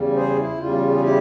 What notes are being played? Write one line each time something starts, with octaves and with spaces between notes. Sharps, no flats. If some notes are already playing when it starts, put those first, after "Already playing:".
Already playing: E2 C#3 G3
G#4 C5
E4
E2 C#3 G3 F4
G#4
E4 G4